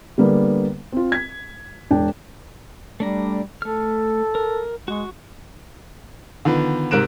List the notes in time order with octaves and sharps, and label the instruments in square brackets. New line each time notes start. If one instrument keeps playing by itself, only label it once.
[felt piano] D3 G3 A#3 B3
C4 F4
G#6 B6
E1 D4 G5
[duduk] G3 [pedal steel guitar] A3 D4 A#5
[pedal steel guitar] A3 F6 [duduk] A4
[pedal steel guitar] A#4
[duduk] G#3 [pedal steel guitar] F#4 C#6
[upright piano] D3 D#3 F3 B3
G#2 C3 A#4 F#6 D7 E7